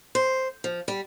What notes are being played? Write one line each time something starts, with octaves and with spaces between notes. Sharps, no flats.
C5
F3
G3